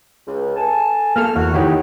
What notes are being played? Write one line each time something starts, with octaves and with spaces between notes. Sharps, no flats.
C#2
A4 G#5 A5
A#3 A4 F6
E2 F#4
D#3 E4 G4 C#5 F#5